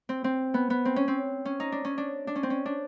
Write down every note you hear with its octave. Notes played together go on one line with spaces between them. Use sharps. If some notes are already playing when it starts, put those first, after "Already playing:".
C4
C4
B3
B3
C4
C#4
C4
C#4
D#4
D4
C#4
D4
D4
C#4
C4
C#4
D4